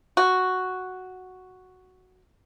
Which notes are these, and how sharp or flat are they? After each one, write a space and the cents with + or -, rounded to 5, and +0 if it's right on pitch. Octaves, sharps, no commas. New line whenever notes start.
F#4 +0